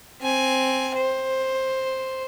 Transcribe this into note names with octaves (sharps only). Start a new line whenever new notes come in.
C4 G#5
C5